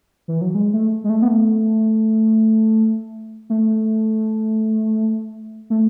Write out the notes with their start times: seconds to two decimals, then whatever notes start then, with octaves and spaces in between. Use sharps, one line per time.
0.28 E3
0.41 F#3
0.55 G#3
0.73 A3
1.04 G#3
1.10 A3
1.22 B3
1.28 A3
3.50 A3
5.70 A3